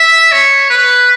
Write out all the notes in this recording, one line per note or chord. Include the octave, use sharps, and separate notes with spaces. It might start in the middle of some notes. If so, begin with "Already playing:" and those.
Already playing: E5
C#5
B4